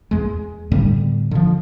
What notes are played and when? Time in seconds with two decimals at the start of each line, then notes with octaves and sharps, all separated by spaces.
0.11 E2 G#3
0.72 A2 D3 G3 B3
1.31 D3 F3